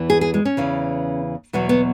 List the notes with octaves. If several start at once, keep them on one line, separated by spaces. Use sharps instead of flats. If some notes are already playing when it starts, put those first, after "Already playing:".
Already playing: E2 E3
G#4
G#4
G#3
C#4
E2 C#3 E3
E2 B2 F#3 B3
B3